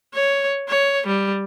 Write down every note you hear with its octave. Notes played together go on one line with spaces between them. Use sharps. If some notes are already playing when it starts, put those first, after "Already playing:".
C#5
C#5
G3